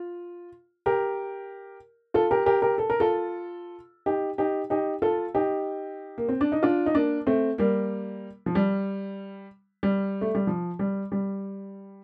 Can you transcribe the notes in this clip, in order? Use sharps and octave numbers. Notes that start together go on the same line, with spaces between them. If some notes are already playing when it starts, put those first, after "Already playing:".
Already playing: F4
G4 A#4
F4 A4
G4 A#4
G4 A#4
G4 A#4
A4
A#4
F4 A4
D#4 G4
D#4 G4
D#4 G4
F4 A4
D#4 G4
A#3
C4
D4
D#4
D4 F4
D#4
A#3 D4
A3 C4
G3 A#3
F3
G3
G3
A3
G3
F3
G3
G3